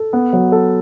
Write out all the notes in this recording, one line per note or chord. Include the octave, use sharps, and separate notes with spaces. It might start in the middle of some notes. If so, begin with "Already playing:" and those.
Already playing: A4
B3
F#3
A4